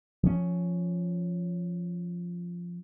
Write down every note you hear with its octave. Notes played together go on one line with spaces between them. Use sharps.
F3 C#4